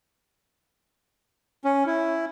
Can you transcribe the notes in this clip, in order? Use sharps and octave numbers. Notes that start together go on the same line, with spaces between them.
C#4
E4